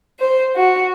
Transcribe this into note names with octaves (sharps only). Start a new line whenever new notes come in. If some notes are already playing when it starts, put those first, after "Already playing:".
C5
F#4